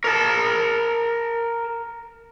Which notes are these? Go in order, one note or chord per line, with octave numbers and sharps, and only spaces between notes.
A#4 A5